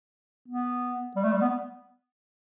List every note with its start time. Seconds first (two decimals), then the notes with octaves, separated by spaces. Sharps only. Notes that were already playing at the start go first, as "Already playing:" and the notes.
0.48 B3
1.16 G3
1.24 A3
1.33 G3
1.41 B3